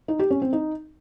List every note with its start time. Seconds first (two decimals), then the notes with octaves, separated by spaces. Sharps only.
0.08 D#4
0.19 G4
0.31 C#4
0.42 C4
0.53 D#4